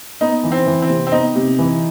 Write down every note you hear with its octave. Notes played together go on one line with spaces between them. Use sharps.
B3 D#4
E3
C4
E3
C4
C3
C4
B3 D#4
C3
E3